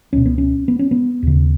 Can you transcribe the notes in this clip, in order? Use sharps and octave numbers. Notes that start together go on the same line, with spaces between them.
C#2 B2 C#4
B3
C#4
B3
C#4
B3
D#2 C#3